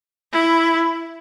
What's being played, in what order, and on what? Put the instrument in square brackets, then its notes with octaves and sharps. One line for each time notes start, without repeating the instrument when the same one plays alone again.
[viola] E4